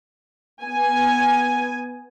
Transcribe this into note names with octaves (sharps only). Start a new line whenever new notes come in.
B3 G#5